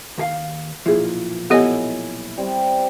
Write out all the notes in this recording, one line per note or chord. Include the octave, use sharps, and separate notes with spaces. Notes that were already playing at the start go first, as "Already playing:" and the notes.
D#2 G#4 F5
B1 A#2 F3 E4 G#4
B3 E4 G4 A4 C#5 D#5 G#5
G3 C4